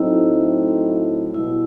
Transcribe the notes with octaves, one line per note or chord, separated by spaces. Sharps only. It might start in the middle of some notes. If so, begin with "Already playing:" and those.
Already playing: A2 F#3 A3 C4 D#4 E4
B2 G3 E4